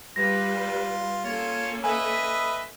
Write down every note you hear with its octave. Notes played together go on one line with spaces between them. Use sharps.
G3 F4 B4 A#6
A#3 C#4 F4 A4 C#5
B4 D#5 E5 G#5